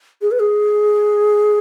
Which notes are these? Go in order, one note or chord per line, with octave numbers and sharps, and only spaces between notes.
G#4
B4
G#4